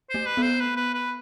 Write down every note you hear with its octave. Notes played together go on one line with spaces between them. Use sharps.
A3 C5
B4
B3
C5
B4
B4
B4